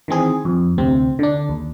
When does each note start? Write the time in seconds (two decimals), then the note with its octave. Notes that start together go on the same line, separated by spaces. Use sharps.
0.08 D#3 E3 C4 G#4
0.45 F2
0.78 D2 C3 C4
1.19 D3 D4
1.49 D#2